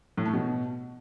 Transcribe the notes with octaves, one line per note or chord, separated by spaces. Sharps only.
A2
A3
B2